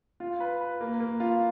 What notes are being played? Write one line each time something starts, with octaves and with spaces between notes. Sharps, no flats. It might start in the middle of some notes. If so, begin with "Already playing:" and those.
F4
B4
B4
A#3
A#3
F4